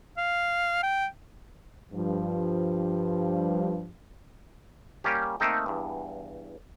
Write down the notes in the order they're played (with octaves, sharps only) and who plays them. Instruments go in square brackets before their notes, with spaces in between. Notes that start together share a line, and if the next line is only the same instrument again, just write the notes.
[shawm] F5
G5
[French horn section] G2 F3
[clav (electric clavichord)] G3 A#3 C#4 G4
A3 A#3 C4 D#4 A4 G5
E2 G2